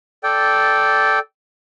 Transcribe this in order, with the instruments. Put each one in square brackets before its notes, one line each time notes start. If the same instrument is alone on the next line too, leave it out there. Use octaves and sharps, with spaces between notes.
[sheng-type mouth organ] A4 D5 G5